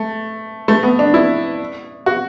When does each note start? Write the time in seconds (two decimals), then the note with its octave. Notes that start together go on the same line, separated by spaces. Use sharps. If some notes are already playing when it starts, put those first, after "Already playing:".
Already playing: A3
0.68 A3
0.83 B3
0.99 D4
1.14 E4
2.06 F#4